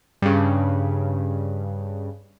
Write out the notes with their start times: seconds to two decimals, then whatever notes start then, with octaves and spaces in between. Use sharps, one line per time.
0.22 G2 C#3